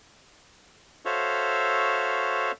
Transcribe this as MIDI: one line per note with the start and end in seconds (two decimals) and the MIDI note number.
1.05 2.51 66
1.05 2.51 69
1.05 2.51 72
1.05 2.51 73
1.05 2.51 76
1.05 2.51 77